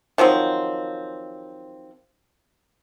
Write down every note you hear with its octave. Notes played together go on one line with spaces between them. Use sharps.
D#3 F3 F#3 C4